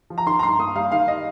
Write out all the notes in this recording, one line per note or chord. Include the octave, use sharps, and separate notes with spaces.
F3
A#5
D#3 C6
A#5
G2 C6
A#3 D#6
G3 F5
D#3 F5
D#5